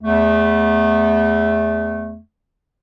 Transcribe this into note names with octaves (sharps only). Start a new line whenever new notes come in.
E2 A3